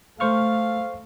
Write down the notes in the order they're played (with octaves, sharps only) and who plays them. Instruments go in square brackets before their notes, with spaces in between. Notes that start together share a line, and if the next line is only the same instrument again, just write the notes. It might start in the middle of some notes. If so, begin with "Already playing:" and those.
[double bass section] A3 [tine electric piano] C5 C#6 F6 [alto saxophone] F5